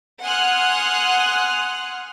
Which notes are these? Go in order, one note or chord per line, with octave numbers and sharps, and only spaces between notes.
F#5 G#5 C6 D#6 F6 F#6